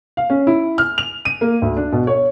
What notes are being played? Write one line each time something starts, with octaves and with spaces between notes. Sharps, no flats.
F5
C#4
E4
F6
F7
D#7
A#3
D2
D4
B2
C#5